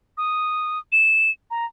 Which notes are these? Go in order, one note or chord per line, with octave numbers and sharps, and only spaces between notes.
D#6
E7
A#5